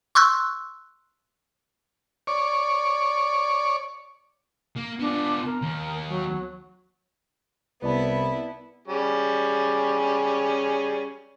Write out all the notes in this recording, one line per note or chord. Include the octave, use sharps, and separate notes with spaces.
C6 C#6 E6 F#6
C#5 D5
A#3
B3 D4 F4
A#4
D#2
F#3
C2 B3 E4 B4 D5 A5
G3 C#4 G#4